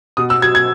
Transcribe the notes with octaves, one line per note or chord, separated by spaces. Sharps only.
B2 D#6
E6
F#3 G#6
G#6